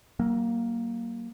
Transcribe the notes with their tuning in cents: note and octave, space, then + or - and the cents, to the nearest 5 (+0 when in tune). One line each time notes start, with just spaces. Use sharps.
F#3 +40 A#3 +0